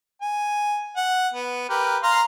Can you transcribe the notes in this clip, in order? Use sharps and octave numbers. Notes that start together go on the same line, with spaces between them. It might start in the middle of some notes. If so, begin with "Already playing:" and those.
G#5
F#5
B3
G4 A#4 B4
F5 A#5 C6